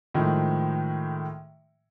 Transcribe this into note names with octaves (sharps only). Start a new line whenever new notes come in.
A2 D#3 F3 G#3